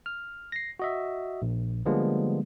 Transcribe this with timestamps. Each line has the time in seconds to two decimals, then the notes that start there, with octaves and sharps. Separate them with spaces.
0.06 F6
0.52 A#6 C7
0.79 F#4 D#5 E5
1.42 A#1
1.86 D3 F3 G3 G#3 A#3 B3